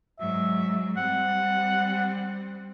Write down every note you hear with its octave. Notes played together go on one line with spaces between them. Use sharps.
G#2 F#3 E5
G3 C4 F#5